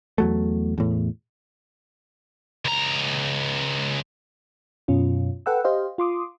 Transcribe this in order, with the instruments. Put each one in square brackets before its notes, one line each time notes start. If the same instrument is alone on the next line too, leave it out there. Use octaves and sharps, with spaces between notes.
[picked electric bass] E2 F#3 A3
E2 A2
[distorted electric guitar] C#2 A#5
[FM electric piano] F#2 B2 C#4 F4
A4 B4 F#5 G5 E6
G4 C5 D#5 F5
F4 C6 D6 D#6